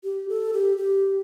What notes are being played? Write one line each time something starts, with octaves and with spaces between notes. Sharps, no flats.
G4
A4
G4
G4